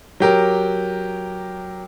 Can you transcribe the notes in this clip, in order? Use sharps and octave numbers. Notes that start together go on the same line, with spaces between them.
F#3 G4 A#4